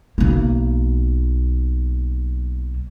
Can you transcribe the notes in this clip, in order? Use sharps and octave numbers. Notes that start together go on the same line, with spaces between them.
B1 A#3